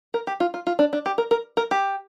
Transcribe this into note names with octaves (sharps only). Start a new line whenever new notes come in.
A#4
G4
F4
F4
F4
D4
D4
G4
A#4
A#4
A#4
G4